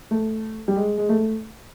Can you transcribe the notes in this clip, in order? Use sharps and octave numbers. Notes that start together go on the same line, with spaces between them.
A3
G3
G#3
G#3
A3